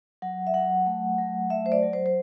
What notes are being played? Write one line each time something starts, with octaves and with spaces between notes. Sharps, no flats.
F#3 F#5
E5
F#3 F#5
A3
F#3
A3 E5
C5
D5
F#3
C5
C5